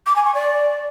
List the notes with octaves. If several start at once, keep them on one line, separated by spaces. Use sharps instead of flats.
D6
G#5
C#6
D5